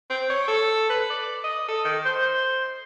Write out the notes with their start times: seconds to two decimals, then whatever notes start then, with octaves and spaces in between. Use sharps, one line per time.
0.10 C4
0.30 C#5
0.48 A4
0.90 B4
1.10 D5
1.44 D#5
1.68 A4
1.84 D#3
2.05 C5